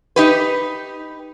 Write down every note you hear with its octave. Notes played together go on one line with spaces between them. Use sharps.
D#4 G4 B4